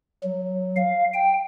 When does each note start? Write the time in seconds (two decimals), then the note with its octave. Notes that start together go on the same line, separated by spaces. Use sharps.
0.23 F#3
0.76 F5
1.14 G5